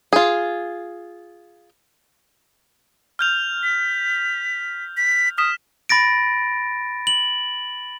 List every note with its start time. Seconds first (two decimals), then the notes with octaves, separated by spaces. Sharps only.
0.13 F4 G#4
3.19 F6 G6 F7
3.63 B6
4.97 B6
5.38 D#6 F6 B6 E7
5.89 B5 A6 A#6 D7
7.07 F#7